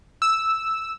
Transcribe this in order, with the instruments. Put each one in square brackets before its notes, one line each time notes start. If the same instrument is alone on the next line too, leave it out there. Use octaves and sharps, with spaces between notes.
[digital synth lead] E6